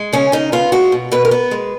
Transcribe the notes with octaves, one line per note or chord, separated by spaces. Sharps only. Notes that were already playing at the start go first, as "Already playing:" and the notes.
Already playing: G#3
C#3 C#4
C#3 D#4
B3 F4
G#3 F#4
B2
B2 B4
A#4
B3 B4
G#3